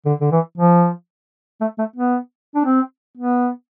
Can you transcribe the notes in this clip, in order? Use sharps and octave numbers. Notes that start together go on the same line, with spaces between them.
D3
D3
E3
F3
A3
A3
B3
D4
C4
B3